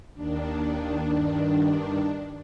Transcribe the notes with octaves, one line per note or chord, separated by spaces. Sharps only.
D#2 D#3 D4
G2 D#3